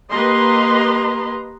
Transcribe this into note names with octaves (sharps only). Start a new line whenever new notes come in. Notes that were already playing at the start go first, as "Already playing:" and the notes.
A#3 G4 B4 D#5 A#5 C6